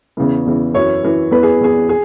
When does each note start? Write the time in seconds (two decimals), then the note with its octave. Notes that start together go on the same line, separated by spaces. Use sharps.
0.17 E2 C#3 E3
0.46 E2 C#3 E3
0.74 F#2 E3 C#5
1.03 F#2 E3
1.31 E2 E3 B4
1.43 G#4
1.61 E2 E3 G#4
1.89 G#4